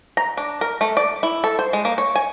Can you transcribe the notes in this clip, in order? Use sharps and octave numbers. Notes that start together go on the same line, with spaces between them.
A#5
D4
A#4
A3
D5
E4
A4
C5
G#3
A#3
C#5
G#5